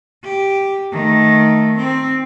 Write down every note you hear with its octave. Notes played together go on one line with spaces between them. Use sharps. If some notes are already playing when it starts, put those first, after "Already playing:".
G4
D#3 A3
C4